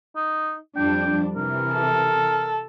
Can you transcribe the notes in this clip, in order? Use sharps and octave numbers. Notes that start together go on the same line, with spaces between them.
D#4
F2 G3 D4 G5
C3 E3 A#4
A4